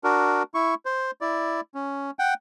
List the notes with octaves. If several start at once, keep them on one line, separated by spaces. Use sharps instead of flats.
D4 F#4 A#4
E4 C#6
C5
E4 D5
C#4
F#5 G5